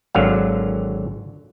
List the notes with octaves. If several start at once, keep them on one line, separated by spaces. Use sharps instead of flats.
G#1 D3 F#3 F5